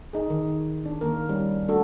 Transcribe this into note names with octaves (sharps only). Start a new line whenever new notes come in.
D#4 G#4
D#3
D4
D#3 A#3 A#4
G3 C#4
A3 D4 F#4 A4